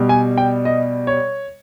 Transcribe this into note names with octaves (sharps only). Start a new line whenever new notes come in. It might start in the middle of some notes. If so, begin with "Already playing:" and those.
Already playing: B2 G3
G#5
G5
D#5
C#5